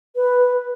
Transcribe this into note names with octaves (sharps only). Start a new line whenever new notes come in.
B4